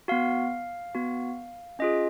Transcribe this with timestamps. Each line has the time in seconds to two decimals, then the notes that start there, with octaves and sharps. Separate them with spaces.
0.08 B3 F#4 F5
0.95 B3 F#4
1.79 C#4 F4 G#4 D#5